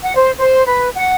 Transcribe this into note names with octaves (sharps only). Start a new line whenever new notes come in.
F#5
C5
C5
B4
F#5